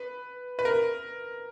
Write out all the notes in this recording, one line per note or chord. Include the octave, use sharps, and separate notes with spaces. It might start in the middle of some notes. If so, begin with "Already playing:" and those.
Already playing: B4
B4
A#4